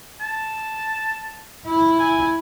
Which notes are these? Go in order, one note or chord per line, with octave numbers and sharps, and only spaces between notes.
A5
E4
G#5